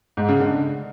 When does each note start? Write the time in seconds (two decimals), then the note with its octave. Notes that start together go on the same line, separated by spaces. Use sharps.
0.17 G#2
0.29 C#3
0.40 D3